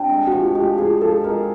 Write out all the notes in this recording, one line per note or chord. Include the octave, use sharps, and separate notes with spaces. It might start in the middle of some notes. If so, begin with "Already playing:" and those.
Already playing: C3 D4
G#3
F#4
F3
G4
G#3
G4
F3 G#4
F3 A4
G#3 A#4